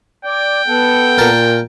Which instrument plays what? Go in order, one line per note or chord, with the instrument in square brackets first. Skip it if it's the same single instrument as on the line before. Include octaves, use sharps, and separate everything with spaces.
[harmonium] D5 [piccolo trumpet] G5
[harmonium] B3 A4 F#5
[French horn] A#2 [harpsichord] A#4 A5